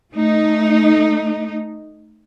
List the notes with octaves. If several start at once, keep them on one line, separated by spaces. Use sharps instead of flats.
A3 D#4